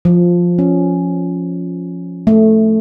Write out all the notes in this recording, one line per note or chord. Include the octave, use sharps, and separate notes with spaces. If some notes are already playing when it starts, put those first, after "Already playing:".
F3
C#4
A3